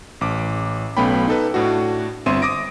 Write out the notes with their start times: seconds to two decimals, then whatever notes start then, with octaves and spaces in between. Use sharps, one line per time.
0.21 A1 D6
0.97 B1 A3 B3 C#4 G5 B5
1.28 D#4 A4 B4
1.54 A2 D4 F#4
2.26 G1 C4 E5 C6 D#7
2.42 D6 D#6 A#6 D7